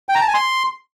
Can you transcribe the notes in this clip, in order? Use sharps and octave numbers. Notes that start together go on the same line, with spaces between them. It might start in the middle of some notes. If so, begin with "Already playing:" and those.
G5
A#5
A5
G#5
C6